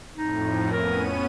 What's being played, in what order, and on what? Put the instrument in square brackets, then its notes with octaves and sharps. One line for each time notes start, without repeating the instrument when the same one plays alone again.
[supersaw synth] F2 A2 [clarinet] D#4
[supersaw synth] B3 C#4 D#7 [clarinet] A#4